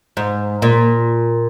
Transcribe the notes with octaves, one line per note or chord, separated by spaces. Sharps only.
G#2
A#2